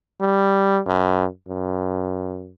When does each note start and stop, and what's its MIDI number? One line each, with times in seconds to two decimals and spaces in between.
0.21 0.80 55
0.86 1.25 42
1.48 2.52 42